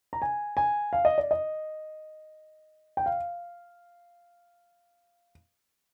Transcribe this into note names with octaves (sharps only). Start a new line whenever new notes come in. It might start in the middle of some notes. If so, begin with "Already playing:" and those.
A#5
G#5
G#5
F5
D#5
D5
D#5
G5
F5